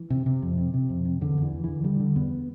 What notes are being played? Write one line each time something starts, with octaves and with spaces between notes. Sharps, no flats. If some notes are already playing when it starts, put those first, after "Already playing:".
Already playing: E3
C3
C3
F2
C3
C3
F2
C3
E2 D3
E2 E3
E2
D3 E3
D3 G3
D3
E2 B3